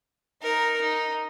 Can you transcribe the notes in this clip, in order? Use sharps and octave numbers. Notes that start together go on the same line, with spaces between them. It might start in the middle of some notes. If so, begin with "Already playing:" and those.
D#4 A#4
D#4